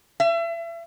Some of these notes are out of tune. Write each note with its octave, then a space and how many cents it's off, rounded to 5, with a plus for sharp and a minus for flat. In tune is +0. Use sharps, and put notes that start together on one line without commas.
E5 +35